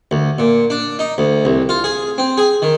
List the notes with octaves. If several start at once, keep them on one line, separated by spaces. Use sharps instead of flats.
D2
A#2
D4
D#4
D2
C2
F4
G#4
C4
G#4
D#3